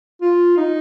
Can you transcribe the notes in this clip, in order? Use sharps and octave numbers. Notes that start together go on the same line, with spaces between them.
F4
D#4